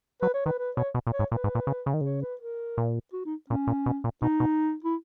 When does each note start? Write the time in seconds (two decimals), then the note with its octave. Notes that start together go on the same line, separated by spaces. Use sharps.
0.22 F#3 B4
0.34 C#5
0.46 D#3 B4
0.58 B4
0.76 B2 C#5
0.94 B2
1.07 A#2
1.12 C#5
1.19 G#2
1.31 A#2 B4
1.44 G#2
1.55 A#2
1.67 C#3
1.86 C#3
1.94 D#3
2.01 C#3 C#5
2.22 B4
2.41 A#4
2.77 A#2
3.13 F#4
3.26 D#4
3.50 A#2 C#4
3.67 A#2
3.86 B2
4.04 A#2
4.22 B2 D#4
4.40 B2
4.85 E4